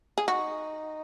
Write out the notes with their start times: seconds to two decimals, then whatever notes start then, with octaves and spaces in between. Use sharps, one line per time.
0.18 G#4
0.27 D#4 F#4